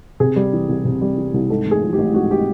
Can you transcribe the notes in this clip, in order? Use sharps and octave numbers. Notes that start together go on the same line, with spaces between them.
C3 G#4
G3
E3
C2
C3
G3
E3
C2
G#2 A4
A1
G#4
F3
G4
A1
G#2 F#4
G4